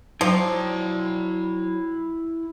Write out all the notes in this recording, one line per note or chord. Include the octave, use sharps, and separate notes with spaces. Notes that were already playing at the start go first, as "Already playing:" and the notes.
F3 F#3 E4 D5 G5